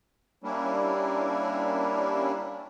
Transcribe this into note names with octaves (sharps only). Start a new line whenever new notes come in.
G3 A#3 C#4 D4 E4